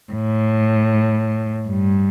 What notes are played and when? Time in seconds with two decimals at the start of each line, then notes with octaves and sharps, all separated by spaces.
0.13 A2
1.69 G2